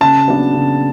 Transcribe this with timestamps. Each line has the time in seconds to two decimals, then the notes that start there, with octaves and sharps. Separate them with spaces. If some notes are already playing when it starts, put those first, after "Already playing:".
0.01 C#3 A5
0.28 F#3 B3 D4
0.54 C#3